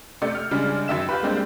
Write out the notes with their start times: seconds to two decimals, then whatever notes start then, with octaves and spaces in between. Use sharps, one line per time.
0.22 C3 A3 D5 G6 C#7
0.35 F6
0.51 C#3 G3 G#3 D4
0.88 F#2 D#3 E5 E7
1.09 F4 G4 B4
1.23 G3 G#3 A#3 C4 D4 G4